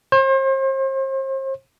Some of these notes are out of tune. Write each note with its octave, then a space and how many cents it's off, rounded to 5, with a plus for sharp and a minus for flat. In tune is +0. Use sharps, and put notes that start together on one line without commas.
C5 +40